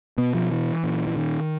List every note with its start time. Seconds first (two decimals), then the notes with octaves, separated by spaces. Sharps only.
0.18 B2 B3
0.34 F3
0.51 E3
0.84 A#2
1.07 E3
1.17 D#3